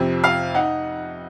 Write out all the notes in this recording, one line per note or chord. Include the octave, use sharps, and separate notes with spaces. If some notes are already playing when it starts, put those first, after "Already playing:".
Already playing: F2 C3 F3 C4
F5
D#4 F#5